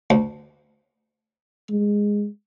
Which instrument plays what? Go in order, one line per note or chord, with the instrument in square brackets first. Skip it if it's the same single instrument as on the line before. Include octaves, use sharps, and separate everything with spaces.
[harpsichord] D2
[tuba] G#3